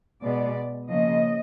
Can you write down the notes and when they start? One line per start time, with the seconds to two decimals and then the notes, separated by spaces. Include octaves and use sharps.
0.22 B2 G#3 B3 D5
0.89 C#3 F3 A#3 D#5